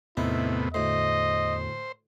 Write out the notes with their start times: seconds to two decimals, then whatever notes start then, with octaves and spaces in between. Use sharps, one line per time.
0.17 E2 A2 C3 B3 D#4 E4
0.74 D2 A2 C5 D#5